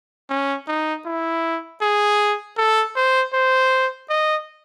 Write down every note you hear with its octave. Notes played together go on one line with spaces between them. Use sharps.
C#4
D#4
E4
G#4
A4
C5
C5
D#5